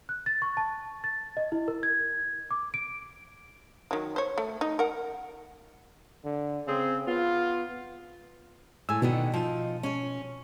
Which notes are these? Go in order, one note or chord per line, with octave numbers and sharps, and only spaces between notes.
F#6
A6
C#6
A5
A6
D#5
E4
A#4
G#6
D6
D7
D#3 F#3
C5 C#5
A3
D#4
A#4 F#5
D3
C#3 C4 G#4
B3 F4
A2 G#5 E6
B2 D3 D#3 B3
F3 D#4
C#4 C#5